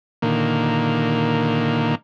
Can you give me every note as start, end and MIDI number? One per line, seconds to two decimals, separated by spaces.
0.22 1.95 46
0.22 1.95 50
0.22 1.95 51
0.22 1.95 58